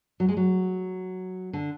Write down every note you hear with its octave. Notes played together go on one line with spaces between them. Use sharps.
F#3
G#3
F#3
D3